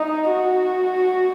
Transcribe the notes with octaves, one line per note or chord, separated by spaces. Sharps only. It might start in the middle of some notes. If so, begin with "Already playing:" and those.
Already playing: D#4
F#4